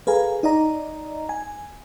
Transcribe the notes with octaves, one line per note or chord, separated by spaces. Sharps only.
G#4 A4 B4 F5 G#5 A#5
D#4 D5 D#5 A#5
G#5